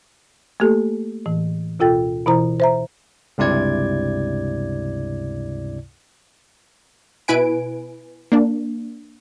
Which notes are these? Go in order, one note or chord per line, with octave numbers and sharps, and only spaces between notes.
A3 A#3 G4 A4
A2 E3
D2 B2 F4 A4 G5 A6
B2 E3 E4 C5 A#5
C5 E5 A#5
C#2 G2 C3 E4 D5 G#6
B2 E4 B4 G#5 D7
A#3 D4